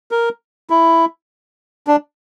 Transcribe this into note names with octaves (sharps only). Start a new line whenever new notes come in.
A#4
E4
D4